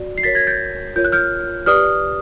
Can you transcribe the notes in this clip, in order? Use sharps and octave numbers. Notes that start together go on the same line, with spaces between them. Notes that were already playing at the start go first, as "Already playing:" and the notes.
Already playing: F#4 D5
C7
F#4 A#4 C#5 A6 B6
G#6 A#6
G6 A6
F4 A#4 C#5 G6
F#6
F6 G6
G4 B4 D5 D#6 F6